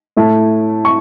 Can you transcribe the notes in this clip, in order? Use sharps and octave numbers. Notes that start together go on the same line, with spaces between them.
A2 A3 E4
C#6